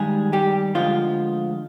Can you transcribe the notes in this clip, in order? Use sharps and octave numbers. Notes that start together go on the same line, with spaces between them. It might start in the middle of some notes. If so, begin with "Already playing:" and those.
Already playing: G2 D#3 G3 G#3 G#4
G3 G4
D2 D3 F3 G#3 F4